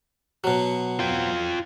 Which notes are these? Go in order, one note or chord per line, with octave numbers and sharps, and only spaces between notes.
B2 F#3
F4 G5